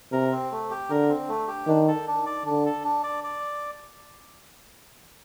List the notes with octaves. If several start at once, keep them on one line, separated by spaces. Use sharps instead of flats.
C3 A#4
C4
A3
G4
D3 A#4
C4
A3
G4
D#3 D4
A4
D4
D5
D3 D4
A4
D4
D5
D5